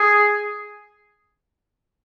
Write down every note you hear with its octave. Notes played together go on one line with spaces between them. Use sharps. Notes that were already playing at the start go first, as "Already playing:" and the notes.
Already playing: G#4